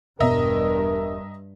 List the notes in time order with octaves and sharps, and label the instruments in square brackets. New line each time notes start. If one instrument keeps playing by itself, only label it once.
[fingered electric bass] E1 B2 B3 [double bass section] G2 [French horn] A#4 [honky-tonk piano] D#5 E5 A#5